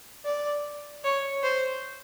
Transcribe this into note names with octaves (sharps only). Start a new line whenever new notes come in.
D5
C#5
C5